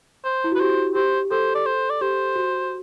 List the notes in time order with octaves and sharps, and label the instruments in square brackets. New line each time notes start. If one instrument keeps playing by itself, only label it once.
[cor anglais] C5
[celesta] E4
F#4
[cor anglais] B4
[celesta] G4 [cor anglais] C5
[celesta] G4 [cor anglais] C5
[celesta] A4 [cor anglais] C5
[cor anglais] D5
C5
D5
[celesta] G4 [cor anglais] C5
[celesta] F#4